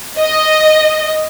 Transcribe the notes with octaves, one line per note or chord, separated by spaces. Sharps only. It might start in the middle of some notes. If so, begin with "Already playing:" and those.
D#5